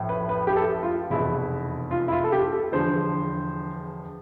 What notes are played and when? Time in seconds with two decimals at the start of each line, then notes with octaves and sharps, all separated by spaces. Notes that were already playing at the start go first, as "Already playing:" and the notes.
Already playing: A1 A2 F3
0.09 B4
0.29 B4
0.47 G4
0.56 A4
0.83 F4
1.10 F1 E2 B2 E4
1.91 F4
2.08 E4
2.12 F4
2.24 A4
2.32 G4
2.52 A4
2.72 E1 E2 D3 F3 C5